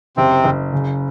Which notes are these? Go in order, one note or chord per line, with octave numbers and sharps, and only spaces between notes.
F#1 C3 C4
F#1
C#3